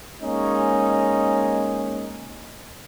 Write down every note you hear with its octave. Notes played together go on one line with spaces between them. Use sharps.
G#3 A#3 C#4 D#4